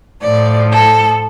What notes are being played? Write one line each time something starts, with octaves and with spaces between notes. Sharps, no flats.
A2 F3 D5
A4